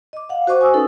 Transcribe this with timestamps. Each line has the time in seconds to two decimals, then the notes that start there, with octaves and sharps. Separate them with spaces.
0.13 D#5 D6
0.29 F5 F#5
0.47 F#4 C5 D#5 C#6 D6
0.61 G#5 D#6 E6
0.73 C#4 D#4 A4 B4